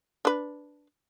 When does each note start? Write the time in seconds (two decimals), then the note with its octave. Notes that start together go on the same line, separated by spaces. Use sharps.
0.25 D4 B4